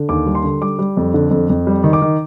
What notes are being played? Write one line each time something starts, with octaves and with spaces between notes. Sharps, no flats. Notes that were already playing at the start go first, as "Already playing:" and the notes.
Already playing: D3
D#2 D6
G3
C6
D3
G3 D6
G3
F2
D3
F2
F2
G3
D#3
D6
D#3